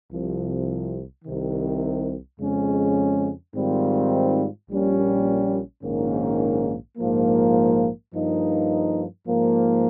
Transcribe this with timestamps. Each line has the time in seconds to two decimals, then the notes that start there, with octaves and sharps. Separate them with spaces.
0.10 C2 C3 F3
1.25 C2 C3 D#3
2.39 F2 C#3 G#3 C#4
3.54 G#2 D#3 G3 C4 F4
4.69 A#1 A#2 G3 C#4
5.83 A#1 G#2 D#3 A#3 C#4
6.98 A#1 G#2 F3 A#3
8.13 G2 F3 A#3 D#4
9.28 G#2 F3 A#3